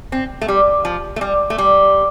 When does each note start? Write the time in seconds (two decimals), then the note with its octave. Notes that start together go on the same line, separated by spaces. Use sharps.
0.12 C4
0.41 A3
0.48 G3
0.85 F3
1.16 A3
1.21 G3
1.50 A3
1.58 G3